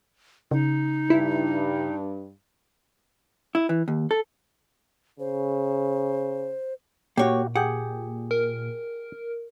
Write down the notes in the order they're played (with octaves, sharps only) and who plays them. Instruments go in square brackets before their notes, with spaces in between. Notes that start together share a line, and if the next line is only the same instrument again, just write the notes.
[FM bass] C#3 [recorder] D#4
[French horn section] G2 [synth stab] E4
[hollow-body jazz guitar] E4
E3
D#2
A4
[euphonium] C#3 [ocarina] C5
[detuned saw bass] A#2 [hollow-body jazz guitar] A#3 C#5 [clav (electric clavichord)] F#4 G4
[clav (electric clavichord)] G4 G#4 G5 [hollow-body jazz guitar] F#5
[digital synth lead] A#4